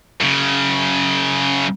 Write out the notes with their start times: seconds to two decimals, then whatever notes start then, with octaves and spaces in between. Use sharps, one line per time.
0.21 F#2 C#3